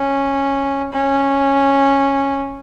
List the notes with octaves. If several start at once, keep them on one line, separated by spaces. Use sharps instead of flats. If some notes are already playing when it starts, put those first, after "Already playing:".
Already playing: C#4
C#4